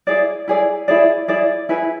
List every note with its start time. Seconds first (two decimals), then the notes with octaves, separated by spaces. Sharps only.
0.07 E4 G#4 D5
0.48 E4 G#4 D5
0.88 E4 G#4 D5
1.28 E4 G#4 D5
1.69 E4 G#4 B4